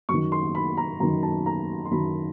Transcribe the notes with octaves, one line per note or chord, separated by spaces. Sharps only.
F#2 D#3 C#6
C6
B5
A#5
F#2 D#3 A#5
A5
A#5
C6
F#2 D#3 B5